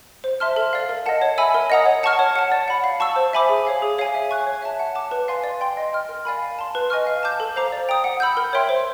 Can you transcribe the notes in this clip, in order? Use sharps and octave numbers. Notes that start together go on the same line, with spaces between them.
C5
E5 A5 C6 F6
A4
D5 F5
A#4
D#5 F#5 A5
C#5
E5 G#5 B5 E6
A#4
D#5 F#5 A#5 D#6
C#5
F#5 A5 C#6 F6
C#5
F#5 A5
D5
F#5 B5
F5
A5 C#6 E6
C5
E5 G#5 B5 D6
G#4
C#5 F5 G#5
G#4
C#5 F5 G#5
E5
G#5 C#6 F#6
C#5
E5 A5
F#5
A5 D6
B4
D5 F5 G#5 C6
D5
G5 C6
D#5
G5 C6 F6
A#4
D5 F5 G#5 B5
F5
A5 C6
B4
D#5 G#5 C#6 F6
F5
A5 D6 G6
A4
C5 F5 A#5 D6
D5
G5 A#5 D#6
F#5
B5 E6 G6
A#4
C#5 E5 G5 C6
C5